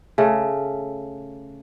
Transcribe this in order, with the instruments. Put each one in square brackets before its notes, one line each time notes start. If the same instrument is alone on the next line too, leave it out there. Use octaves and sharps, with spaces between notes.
[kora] C#3 A3